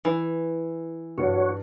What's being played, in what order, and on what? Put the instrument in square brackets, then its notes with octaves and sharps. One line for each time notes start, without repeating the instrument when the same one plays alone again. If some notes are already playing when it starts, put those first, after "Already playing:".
[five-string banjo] E3
[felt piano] G2 F#3 [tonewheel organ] F#4 C#5